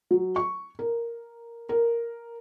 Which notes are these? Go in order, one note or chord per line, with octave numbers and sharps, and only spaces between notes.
F#3
C#6
A#4
A#4